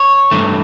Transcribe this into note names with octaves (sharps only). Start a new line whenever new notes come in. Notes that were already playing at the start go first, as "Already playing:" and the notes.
Already playing: C#5
G2 E3 A3